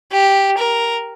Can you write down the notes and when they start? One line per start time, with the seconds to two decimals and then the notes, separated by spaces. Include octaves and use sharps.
0.12 G4
0.57 A#4